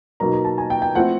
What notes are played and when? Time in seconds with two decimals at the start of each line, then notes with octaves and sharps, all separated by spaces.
0.20 B2 F#3 A#3 D#4 A#5
0.33 A#5
0.45 A5
0.58 G#5
0.70 G5
0.82 G5
0.95 F3 A3 C4 E4 F#5